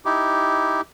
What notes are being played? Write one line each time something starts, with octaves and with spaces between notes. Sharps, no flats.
D#4 E4 G4